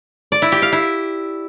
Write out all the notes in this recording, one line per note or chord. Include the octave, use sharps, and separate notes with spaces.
D5
E4
G4
F5
E4